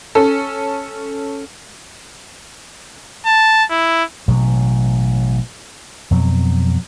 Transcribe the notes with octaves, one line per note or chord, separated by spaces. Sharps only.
C#4 A4
A5
E4
A1 B2 F#3 G#3
F2 B2 F#3 C4